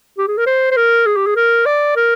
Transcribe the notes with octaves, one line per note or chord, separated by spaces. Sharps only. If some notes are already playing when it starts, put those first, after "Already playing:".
G4
G#4
A#4
C5
C5
A#4
G#4
G4
G#4
A#4
D5
A#4